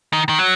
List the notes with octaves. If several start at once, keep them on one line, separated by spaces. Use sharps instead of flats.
D#3
D#3
F#3